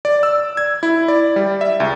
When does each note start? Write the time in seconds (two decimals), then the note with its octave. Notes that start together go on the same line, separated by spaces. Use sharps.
0.05 D5
0.23 E6
0.57 G#6
0.83 E4
1.08 D5
1.36 G3
1.61 E5
1.80 C#2